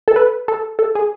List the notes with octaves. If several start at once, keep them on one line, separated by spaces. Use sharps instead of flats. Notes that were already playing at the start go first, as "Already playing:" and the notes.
A4
B4
A4
A4
G#4